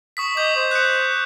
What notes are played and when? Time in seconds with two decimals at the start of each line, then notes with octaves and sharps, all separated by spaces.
0.17 C#6 D#6 B6
0.37 D#5 D6 G6
0.56 C5
0.71 F#6 C#7